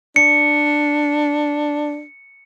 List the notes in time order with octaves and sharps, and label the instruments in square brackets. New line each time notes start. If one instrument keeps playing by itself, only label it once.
[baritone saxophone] D4 [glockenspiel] C#7